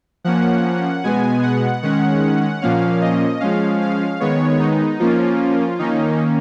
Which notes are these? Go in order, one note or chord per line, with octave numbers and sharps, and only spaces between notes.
F3 A#3 C#4 F#5
B2 G#3 B3 G#5
F#5
D#3 G#3 C#4 F#5
A#2 F3 A#3 C#4 F5
D#5
F3 G#3 C#4 F5
F5
D#3 G#3 B3 C#5
D#4
F3 A#3 C#4 F4
D#3 A#3 C#4 D#4